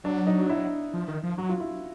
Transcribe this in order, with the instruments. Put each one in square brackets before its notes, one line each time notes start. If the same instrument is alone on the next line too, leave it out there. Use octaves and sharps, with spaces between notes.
[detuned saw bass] F#3 [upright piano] D4
[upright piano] D#4
E4
[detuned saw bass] F3
D#3
F3
[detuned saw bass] F#3 [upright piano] F#4
[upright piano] F4
E4